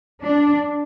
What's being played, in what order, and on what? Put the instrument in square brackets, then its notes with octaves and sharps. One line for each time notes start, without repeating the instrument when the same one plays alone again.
[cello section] D4